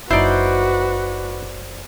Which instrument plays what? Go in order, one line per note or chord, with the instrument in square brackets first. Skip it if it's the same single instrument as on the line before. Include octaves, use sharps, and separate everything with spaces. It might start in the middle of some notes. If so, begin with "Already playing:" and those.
[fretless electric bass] F#1 F#2 [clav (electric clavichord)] D#4 E4 [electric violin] F#4 B4 [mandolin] C5 D5